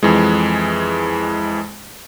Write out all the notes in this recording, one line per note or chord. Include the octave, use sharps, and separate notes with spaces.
F2 E3 G#3